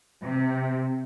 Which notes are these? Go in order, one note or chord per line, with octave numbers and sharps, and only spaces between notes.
C3